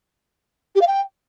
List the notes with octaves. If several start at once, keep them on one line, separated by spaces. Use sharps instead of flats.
G4
F5
G5